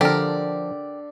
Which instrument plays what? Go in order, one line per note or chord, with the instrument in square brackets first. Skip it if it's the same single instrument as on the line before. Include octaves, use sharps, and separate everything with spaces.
[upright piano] D3 [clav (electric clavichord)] F3 A4 [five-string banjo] G4 A#4 [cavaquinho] D5